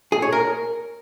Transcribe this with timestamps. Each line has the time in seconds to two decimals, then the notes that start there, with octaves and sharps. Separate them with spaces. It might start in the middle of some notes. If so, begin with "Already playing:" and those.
0.12 G#4
0.22 C#5
0.32 A#4